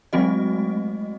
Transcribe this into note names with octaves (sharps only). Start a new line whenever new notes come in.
F#3 G#3 A3 C4 F#4 D#5